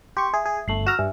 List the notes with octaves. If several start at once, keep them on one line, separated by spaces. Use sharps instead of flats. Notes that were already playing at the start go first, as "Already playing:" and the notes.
G4 C6 C#6
G#4 E5
G#4
G1 A3 C7 F#7
F#4 A#5 E6 F6 E7
G2 E5 G#5